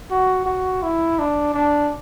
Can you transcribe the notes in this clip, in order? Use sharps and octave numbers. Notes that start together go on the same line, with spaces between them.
F#4
F#4
E4
D4
D4